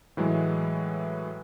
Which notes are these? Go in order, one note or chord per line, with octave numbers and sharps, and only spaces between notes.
A2 E3 F#3 G#3